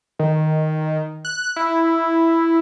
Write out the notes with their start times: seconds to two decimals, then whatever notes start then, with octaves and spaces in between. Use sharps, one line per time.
0.19 D#3
1.25 F#6
1.56 E4